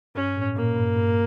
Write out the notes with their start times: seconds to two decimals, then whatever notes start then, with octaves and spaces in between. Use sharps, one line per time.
0.15 G2 C#4
0.36 A2
0.56 A#2 A#3
0.76 G2
0.97 G2